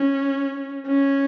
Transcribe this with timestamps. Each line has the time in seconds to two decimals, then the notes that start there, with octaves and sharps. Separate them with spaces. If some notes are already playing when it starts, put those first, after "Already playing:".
Already playing: C#4
0.87 C#4